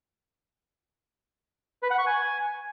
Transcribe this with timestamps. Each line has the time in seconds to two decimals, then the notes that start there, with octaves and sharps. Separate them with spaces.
1.83 B4
1.91 F#5
1.99 C#6
2.06 G#5